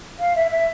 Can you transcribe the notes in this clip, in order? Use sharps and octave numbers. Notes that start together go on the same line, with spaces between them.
F5
E5
E5